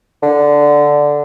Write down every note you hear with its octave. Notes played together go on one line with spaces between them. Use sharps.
D3